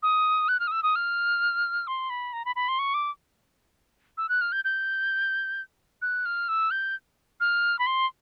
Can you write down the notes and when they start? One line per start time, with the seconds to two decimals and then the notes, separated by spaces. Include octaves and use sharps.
0.03 D#6
0.48 F#6
0.60 F6
0.67 D#6
0.71 E6
0.83 D#6
0.96 F6
1.87 C6
2.10 B5
2.33 A#5
2.45 B5
2.56 B5
2.68 C6
2.79 C#6
2.94 D6
4.18 E6
4.29 F#6
4.41 F6
4.52 G6
4.65 G6
6.02 F#6
6.25 F6
6.48 E6
6.71 G6
7.40 F6
7.79 B5
7.87 C6